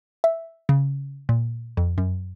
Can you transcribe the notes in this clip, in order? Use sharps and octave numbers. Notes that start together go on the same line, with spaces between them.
E5
C#3
A#2
F2
F#2